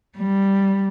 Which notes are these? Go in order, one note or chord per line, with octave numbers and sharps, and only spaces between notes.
G3